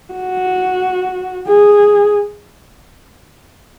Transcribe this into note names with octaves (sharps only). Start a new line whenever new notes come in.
F#4
G#4